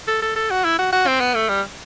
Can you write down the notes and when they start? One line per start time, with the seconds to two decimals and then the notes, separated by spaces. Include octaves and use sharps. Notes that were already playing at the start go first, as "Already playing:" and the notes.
0.08 A4
0.22 A4
0.36 A4
0.50 F#4
0.64 E4
0.79 F#4
0.93 F#4
1.07 C4
1.21 B3
1.35 A3
1.49 G3